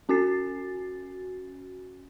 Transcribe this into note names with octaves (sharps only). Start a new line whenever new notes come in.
C#4 F#4 G#5 A6 C7